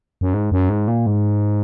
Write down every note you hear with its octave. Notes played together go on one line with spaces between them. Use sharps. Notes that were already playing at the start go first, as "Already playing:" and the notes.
F#2
G#2
F#2
G#2
A#2
G#2